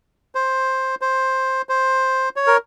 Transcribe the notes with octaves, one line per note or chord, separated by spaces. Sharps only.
C5
C5
C5
C#5
A#4